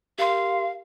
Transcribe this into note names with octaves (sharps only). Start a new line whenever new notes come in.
G4 A#4 F5 C6